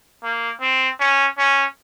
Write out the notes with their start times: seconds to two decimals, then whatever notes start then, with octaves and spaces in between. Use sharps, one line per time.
0.24 A#3
0.62 C4
1.00 C#4
1.38 C#4